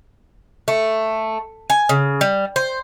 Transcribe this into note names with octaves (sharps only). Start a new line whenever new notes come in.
A3
G#5
C#3
G3
C5